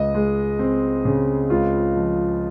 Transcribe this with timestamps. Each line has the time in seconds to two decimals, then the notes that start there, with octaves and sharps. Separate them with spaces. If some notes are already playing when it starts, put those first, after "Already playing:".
Already playing: C#2 D#5
0.14 G#3
0.59 C4
1.05 C#3
1.50 C#2 F4
1.95 F3